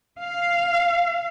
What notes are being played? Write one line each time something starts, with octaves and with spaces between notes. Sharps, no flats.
F5